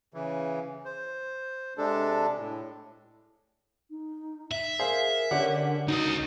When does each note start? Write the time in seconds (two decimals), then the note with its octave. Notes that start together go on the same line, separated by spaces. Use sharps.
0.14 C#3 E3
0.85 C5
1.78 C3 G#3 D4 A4
2.38 A2
3.91 D#4
4.52 E5
4.79 G#4 A#4 C5 F5
5.31 D3 C#4 G4 F#5
5.88 C#2 D#4 F#4 D#5